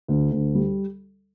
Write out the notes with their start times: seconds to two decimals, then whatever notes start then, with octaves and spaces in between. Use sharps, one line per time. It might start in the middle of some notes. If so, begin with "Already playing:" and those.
0.08 D2
0.31 D2
0.55 G3